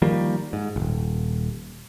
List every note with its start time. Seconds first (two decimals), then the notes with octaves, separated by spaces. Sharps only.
0.02 D#3 F3 G3 A#3
0.53 G#2
0.76 D#1 G#1